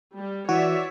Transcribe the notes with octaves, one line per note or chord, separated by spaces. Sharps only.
G3
E3 F#4 C#5 D5 E5